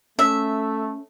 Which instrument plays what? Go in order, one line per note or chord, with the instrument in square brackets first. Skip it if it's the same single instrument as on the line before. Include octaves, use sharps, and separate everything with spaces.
[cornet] A3 [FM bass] C#4 [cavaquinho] E5